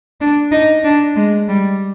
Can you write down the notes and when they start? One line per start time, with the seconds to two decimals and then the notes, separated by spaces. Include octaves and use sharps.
0.21 D4
0.52 D#4
0.84 D4
1.16 G#3
1.48 G3